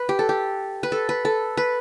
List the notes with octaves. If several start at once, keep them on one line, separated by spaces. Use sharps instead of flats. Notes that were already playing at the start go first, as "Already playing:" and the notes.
Already playing: B4
G4
A4
G4
B4
A4
B4
A4
B4